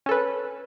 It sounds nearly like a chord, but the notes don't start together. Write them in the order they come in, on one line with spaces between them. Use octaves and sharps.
C#4 A4 B4